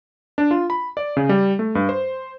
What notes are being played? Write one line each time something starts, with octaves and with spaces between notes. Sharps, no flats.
D4
F4
B5
D5
C#3
G3
A3
G2
C5